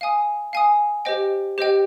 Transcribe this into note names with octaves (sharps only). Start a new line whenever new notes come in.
F5 G#5 D#6
F5 G#5 D#6
G4 C5 D#5 G5
G4 C5 D#5 G5